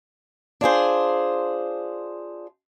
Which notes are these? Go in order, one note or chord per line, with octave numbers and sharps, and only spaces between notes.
D4 F4 G#4 C5